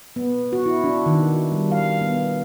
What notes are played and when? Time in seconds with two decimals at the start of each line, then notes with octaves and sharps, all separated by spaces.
0.16 B3
0.53 F#4
0.66 E4
0.84 D4
1.06 D#3
1.23 F#4
1.52 G3
1.72 F5
2.01 B3